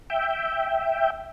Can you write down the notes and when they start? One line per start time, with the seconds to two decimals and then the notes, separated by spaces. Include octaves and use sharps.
0.10 E5 G5